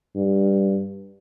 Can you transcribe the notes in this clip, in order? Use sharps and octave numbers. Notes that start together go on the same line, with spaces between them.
G2